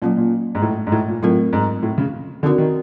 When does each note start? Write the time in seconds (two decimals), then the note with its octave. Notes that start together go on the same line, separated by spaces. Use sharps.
0.02 A#2 F#3 A#3 C#4
0.17 A#2
0.55 G#2
0.62 A2
0.87 G#2
0.92 A2
1.08 A#2
1.23 A2 F#3 A3 C4 F4 A#4
1.53 G#2
1.83 A2
1.98 C#3
2.43 D3 C4 D#4 F#4 A#4 D5
2.58 D#3